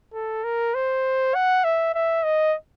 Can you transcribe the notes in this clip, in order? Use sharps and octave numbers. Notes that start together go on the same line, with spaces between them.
A4
A#4
C5
F#5
E5
E5
D#5